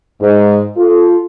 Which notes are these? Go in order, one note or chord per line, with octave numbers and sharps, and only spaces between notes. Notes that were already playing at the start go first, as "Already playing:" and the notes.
G#2
F4 A4